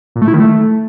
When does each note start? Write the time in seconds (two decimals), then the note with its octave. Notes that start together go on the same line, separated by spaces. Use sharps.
0.16 A#2
0.22 A3
0.28 E4
0.34 D#3
0.40 A3